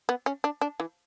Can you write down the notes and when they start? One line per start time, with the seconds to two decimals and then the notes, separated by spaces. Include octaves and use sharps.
0.09 B3
0.26 C#4
0.44 D4
0.61 D4
0.80 E3